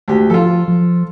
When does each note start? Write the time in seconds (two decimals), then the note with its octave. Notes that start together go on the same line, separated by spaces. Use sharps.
0.08 D2 G4
0.30 F3 F4 A4
0.68 F3